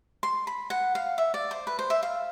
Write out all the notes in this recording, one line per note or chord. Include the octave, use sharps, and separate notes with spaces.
C6
B5
F#5
F5
E5
D5
C5
B4
C5
E5
F5